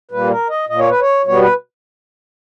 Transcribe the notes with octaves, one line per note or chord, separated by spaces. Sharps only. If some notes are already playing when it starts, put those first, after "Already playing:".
A#2 G3 A#3 B4
A#4
D#5
A#2 A#3 D#5
C#5
B4
C#5
B2 G3 B3 C#5
B4